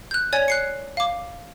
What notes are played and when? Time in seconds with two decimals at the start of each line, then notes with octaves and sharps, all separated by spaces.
0.11 F#6 G6
0.33 C#5 D5 G#5 G#6
0.48 F#6 C7 C#7
0.97 F5 D6